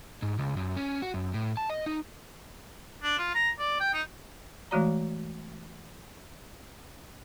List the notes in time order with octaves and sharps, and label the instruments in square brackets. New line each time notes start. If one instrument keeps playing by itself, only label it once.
[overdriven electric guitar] G#2
C#2
F#2
C#4
F#4
F#2
A2
A5
D#5
D#4
[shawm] D4
F4
A#5
D5
G5
D#4
[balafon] E3 G#3 A3 F#4 D5 A#5